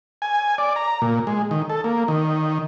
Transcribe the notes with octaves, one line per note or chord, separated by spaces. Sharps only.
G#5
D5
A#5
A#2
G#3
D#3
A4
A#3
D#3